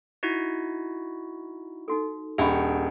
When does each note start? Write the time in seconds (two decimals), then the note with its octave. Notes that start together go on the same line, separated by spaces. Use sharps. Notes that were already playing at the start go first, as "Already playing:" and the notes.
0.23 D#4 E4 F#4
1.88 D#4 F#4 A4
2.38 D#1 D4 G4 G#4 F#5 G5 B5